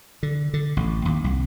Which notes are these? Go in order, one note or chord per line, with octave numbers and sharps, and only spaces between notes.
D3
D3
A1
D#2
C2